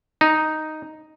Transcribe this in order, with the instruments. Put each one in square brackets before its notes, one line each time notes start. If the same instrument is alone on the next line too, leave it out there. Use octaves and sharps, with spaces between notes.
[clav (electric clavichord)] D#4